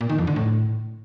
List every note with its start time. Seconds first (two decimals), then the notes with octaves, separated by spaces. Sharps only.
0.01 A#2
0.09 D#3
0.18 F2
0.27 D3
0.36 A2